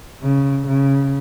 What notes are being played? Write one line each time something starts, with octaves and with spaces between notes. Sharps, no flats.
C#3
C#3